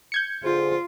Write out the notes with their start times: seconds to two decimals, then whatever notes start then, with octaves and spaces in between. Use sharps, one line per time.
0.12 G6 G#6 C#7
0.44 D3 F4 G#4 C5